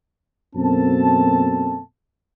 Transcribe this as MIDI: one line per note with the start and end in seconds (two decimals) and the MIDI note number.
0.56 1.81 42
0.56 1.81 47
0.56 1.81 58
0.56 1.81 60
0.56 1.81 69
0.56 1.81 81